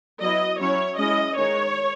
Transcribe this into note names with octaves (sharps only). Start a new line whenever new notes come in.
F#3 B3 E4 D#5
F#3 C#4 E4 C#5
G#3 C#4 E4 D#5
D#3 G#3 D#4 C#5